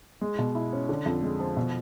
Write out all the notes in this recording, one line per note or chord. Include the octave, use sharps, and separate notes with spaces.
G#3
B2
E4
C#4
D3
F2
G#3
F3
B2